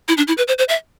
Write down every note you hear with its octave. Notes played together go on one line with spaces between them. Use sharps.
E4
D4
E4
B4
C5
C5
E5